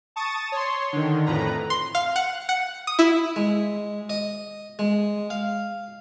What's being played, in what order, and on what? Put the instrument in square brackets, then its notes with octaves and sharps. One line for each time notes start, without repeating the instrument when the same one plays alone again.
[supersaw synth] A5 C#6 D#6 A6
C#5 C6
D3 D#3
F2 A2 B4 A#5
[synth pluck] C6
F5
F#5
F#5
D#6
E4
[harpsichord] G#3
D#5
G#3
F5